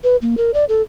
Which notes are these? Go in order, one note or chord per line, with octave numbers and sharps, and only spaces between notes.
B4
A#3
A#4
D5
A4